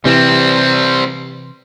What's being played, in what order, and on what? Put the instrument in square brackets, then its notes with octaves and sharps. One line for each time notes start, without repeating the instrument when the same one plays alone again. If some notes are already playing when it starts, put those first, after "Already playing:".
[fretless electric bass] C3 E3 [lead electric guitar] G3 C4